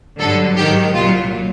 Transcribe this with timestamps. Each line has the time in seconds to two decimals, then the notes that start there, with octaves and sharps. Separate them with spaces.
0.19 G2 D3 F#3 A4
0.57 G#2 D#3 F#3 G4
0.94 C2 A#2 F#3 F4